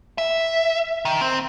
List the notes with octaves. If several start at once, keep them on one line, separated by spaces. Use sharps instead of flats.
E5
D#3
C4